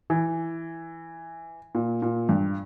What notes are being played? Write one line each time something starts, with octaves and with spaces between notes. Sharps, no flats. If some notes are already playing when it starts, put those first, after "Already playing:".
E3
A#2
A#2
G2